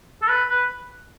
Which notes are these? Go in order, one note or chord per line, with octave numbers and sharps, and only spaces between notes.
A4
B4
B4